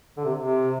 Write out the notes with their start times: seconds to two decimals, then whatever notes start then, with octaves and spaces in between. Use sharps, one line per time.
0.17 D3
0.25 C3
0.40 C3